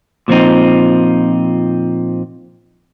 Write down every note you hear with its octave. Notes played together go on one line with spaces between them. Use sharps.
A#2 F3 C4 D#4